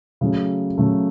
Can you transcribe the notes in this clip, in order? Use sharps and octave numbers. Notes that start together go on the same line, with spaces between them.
C#3 F#3 A3
C#3 F#3 A3